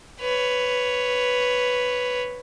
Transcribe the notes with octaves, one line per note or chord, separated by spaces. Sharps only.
B4 C#5